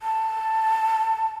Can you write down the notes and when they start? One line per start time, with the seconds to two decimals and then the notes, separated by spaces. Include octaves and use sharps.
0.02 A5